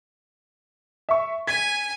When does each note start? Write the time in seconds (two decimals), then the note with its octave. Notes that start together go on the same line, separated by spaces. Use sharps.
1.09 E5 C#6
1.47 G#5 G#6 B6